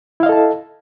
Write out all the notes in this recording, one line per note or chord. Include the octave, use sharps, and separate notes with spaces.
E4 A4 D#5 F5 A5